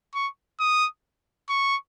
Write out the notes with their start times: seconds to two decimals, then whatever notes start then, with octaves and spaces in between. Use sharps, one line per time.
0.14 C#6
0.60 D#6
1.49 C#6